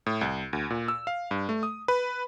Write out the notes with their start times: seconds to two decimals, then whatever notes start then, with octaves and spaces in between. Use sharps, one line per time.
0.06 A2
0.21 C2
0.53 D2
0.70 A#2
0.88 E6
1.07 F5
1.31 G2
1.49 A3
1.63 D#6
1.88 B4